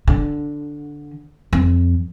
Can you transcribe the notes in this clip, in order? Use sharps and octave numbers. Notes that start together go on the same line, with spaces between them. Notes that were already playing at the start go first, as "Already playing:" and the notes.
D3
F2